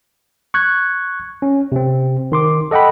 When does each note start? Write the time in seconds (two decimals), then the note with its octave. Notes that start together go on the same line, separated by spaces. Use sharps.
0.54 C#6 F#6 G#6
1.42 C#4
1.72 C3 C4
2.32 D#3 C6 D6
2.71 A4 D#5 F#5 G5 B5